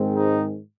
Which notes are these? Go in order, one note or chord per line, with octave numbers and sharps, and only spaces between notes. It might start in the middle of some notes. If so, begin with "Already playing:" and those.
Already playing: G#2 D#3 G#3 C4
D#4